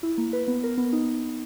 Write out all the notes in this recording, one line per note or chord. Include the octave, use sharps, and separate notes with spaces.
E4
A#3
B4
B3
A#4
B3
D#4